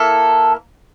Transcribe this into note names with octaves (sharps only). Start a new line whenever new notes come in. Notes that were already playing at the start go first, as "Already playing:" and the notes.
Already playing: A#3 E4 A4